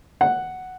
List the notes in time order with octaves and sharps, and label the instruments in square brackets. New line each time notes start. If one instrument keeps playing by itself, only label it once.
[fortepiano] F#5